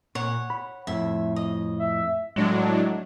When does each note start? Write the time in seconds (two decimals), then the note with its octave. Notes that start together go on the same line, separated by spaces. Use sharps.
0.15 A#2 C#5 F#5
0.50 B5
0.87 F2 A2 E5
1.36 D#5
1.79 E5
2.36 A2 F#3 G#3 D4